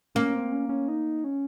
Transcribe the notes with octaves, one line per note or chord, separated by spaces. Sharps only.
A#3 C#4
C4
C#4
C#4
D#4
C#4